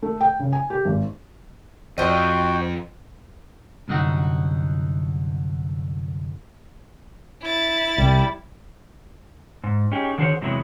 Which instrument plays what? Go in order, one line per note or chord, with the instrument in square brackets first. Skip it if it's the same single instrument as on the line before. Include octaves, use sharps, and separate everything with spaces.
[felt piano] A3
G5
C#3
G#5
G4
G#1
[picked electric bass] F2 [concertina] F#4 G5 [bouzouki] C5 D#5
[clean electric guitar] C2 F#2 D3 D#4 F#4
[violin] E4 A6
[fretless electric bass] C2 [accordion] G3
[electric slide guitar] G#2
C#4 D#4 G4 G#4
D3 D#3 F#4 G#4 C5 C#5
E2 C3 F#3 G#3 B3 E4